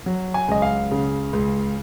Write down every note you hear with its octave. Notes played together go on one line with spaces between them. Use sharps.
F#3
G#5
C#2 D#5
F5
C#3
C#2